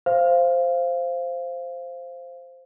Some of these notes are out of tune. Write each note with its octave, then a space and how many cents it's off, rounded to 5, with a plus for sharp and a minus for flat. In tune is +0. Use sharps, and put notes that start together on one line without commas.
C5 +0 F5 -15